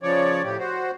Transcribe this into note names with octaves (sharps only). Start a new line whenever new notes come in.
C#3 F3 C#5 D5
A2 G4
F#4 C5